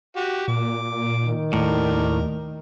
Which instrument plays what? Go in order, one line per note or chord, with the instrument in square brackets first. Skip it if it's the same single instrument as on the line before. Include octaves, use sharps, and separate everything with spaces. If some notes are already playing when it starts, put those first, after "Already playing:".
[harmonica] F#4 G4
[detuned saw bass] A#2 [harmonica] D6
[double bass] D#3
[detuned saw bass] D#2 [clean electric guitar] A2 [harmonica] A#4 D5